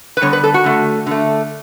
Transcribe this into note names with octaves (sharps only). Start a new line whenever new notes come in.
B4
D3 G3 B3 C#5
B4
A4
F#4
D3 A3
D3 A3